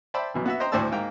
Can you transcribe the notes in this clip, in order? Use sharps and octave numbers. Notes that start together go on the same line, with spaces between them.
C5 D5 E5 G5 A5 B5
F#2 B2 E3
B3 F#4 E5
C5 D#5 G5 A#5 C6
D2 A2 C5 D5 A5 E6
G#2 A#3 G5 A#5